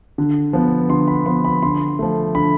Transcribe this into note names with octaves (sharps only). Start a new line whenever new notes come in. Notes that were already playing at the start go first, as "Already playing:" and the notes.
D3
F3 B3
D3 C6
B5
F3 B3 C6
B5
D3 C6
F3 A3
D3 B5